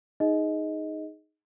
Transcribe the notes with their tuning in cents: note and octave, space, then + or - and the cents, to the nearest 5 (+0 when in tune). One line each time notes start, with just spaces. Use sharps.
D#4 +0 G#4 +0 D#5 +15